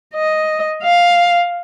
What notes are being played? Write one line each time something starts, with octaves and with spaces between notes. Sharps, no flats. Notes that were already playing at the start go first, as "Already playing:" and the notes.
D#5
F5